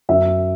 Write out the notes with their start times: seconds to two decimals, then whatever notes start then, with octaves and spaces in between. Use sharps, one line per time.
0.09 F#2 E5